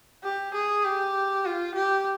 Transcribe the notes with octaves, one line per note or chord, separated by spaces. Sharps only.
G4
G#4
G4
F4
G4